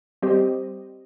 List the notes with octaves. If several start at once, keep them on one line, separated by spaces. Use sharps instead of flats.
G3 C4 G4 C5 D#5